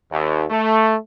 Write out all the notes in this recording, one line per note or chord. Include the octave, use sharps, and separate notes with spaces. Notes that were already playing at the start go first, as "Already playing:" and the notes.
D#2
A3